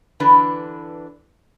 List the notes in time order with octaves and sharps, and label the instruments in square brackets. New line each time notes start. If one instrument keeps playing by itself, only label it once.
[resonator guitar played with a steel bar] D3 E3 D4 B4